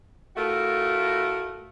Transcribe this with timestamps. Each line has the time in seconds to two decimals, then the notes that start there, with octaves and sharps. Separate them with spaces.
0.36 A2 A3 F4 F#4 A#4